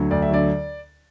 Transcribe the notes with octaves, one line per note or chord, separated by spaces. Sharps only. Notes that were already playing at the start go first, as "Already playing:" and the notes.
Already playing: D2 D3 F#3
D2 D5
E5
D3 F#3 D5